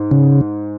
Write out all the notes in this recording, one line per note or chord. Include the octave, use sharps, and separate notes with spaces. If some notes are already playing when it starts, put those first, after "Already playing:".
Already playing: G#2
C#3